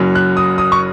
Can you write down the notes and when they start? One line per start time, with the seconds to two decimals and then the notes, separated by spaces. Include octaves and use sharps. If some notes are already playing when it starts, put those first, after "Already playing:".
Already playing: F#1 F#2 F#3
0.15 F#6
0.37 D#6
0.58 D#6
0.72 C#6